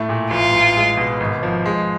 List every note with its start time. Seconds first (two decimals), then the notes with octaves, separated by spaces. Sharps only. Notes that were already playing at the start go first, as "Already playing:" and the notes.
Already playing: A2 A3
0.09 A#2
0.31 A1 F4
0.53 A1
0.76 G#3
0.97 B2
1.20 G#1
1.43 F3
1.66 G#3